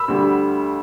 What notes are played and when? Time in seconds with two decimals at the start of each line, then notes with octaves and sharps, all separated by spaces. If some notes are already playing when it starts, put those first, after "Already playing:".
Already playing: B5 E6
0.08 D2 D3 G3